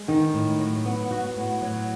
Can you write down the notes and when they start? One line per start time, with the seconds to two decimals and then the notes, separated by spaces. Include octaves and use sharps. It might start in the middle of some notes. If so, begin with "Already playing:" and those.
Already playing: G#3
0.08 D#3 D#4
0.34 A2
0.59 F#3
0.85 B3
1.11 F#4
1.36 A2
1.62 F#3